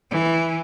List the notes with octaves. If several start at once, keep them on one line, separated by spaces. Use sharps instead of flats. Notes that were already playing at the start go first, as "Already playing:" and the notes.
E3